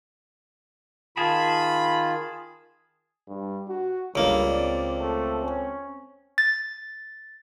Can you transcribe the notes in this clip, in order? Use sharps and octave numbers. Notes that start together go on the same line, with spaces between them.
D#3 F4 G#4 A5 B5
G2
F#4
C#2 G2 A#3
C4 D5
A3
C#4
A6